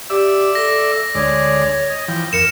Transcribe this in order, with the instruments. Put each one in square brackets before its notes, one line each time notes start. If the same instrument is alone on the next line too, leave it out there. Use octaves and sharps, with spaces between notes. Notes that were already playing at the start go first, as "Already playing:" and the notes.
[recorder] G4 [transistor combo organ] D5 E5 E6
[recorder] A4 [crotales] A#6
[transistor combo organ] D2 G#3 D5 [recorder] C#5
[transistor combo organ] D#5
E3 F3 G5
[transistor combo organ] F2 [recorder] A#4 [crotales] C#7 E7